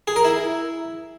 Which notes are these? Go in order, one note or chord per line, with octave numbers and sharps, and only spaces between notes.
G#4
A#4
E4